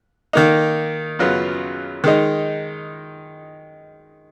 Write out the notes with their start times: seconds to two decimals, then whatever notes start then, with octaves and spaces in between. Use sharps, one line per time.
0.33 D#3 A#3 D#4
1.19 F#2 C#3 F#3 B3 F4
2.04 D#3 G#3 D#4